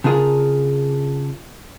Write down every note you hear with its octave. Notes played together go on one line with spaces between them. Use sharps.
C#3 D4 F4 G#4 A#4